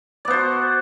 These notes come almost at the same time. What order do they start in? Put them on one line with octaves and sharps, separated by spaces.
D5 B3 C5 F#4